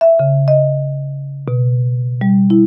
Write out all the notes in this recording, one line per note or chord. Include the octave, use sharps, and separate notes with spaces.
E5
C#3
D#5
B2
G3
E4